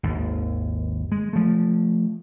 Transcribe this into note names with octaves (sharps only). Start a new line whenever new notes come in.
G#1 D#2
G#3
F3 A3